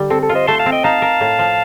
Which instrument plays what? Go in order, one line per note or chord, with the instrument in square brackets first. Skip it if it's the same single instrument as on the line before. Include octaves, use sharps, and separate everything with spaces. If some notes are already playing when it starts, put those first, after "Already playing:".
Already playing: [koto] D3 G3
[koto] C4 [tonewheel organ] A4
[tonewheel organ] A4
[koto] F4
[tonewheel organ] C5 D#5
[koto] A3 [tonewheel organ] A5 C6
[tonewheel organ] F5 A5
[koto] C4
[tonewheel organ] D#5 G5
[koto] D#4 [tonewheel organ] F5 A5
[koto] A#4
A2
F3